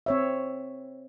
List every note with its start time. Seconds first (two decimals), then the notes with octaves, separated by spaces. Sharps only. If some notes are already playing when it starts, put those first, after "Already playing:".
0.06 C4 C#5 E5